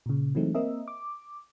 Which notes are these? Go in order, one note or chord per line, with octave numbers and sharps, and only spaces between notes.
A#2 C#3
E3 F#3 G#3 A3 C4 D#4
A#3 C4 A#4 D#5 E5
D6